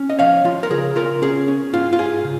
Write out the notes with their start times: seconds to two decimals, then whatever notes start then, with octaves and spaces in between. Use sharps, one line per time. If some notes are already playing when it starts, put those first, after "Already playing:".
Already playing: C#4
0.10 D#5
0.19 F3 C#5 F5
0.44 F3 F4
0.63 A#4
0.70 C#3 G#4
0.95 C#3 F4 A#4
1.22 C#4 G#4
1.48 C#4
1.73 G#2 F4
1.93 F4
1.99 G#2 G#4
2.25 C#3